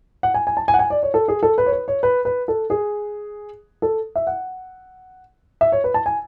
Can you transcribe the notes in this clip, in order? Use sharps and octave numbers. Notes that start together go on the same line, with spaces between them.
F#5
G#5
G#5
A5
G#5
F#5
G#5
D5
C#5
A4
G#4
A4
B4
C#5
B4
C#5
B4
B4
A4
G#4
A4
E5
F#5
E5
C#5
B4
A5
G#5